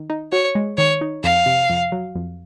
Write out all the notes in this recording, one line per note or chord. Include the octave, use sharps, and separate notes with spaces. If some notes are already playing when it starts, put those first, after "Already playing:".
Already playing: D#3
D#4
F#4 C#5
G#3
D#3 C#5
D#4
F2 F5
C3
F2
F#3
F2